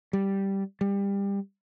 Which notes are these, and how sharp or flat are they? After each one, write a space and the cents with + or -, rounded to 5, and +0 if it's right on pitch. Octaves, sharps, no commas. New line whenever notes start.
G3 -5
G3 +25